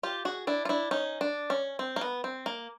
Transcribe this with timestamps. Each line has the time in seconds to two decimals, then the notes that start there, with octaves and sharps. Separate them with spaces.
0.03 F4 G4
0.25 F#4 G#4
0.47 D4 E4
0.65 F4
0.69 D4 E4
0.91 C#4 D#4
1.21 D4
1.50 C#4
1.79 C4
1.96 A#3
2.01 B3
2.24 C4
2.46 A#3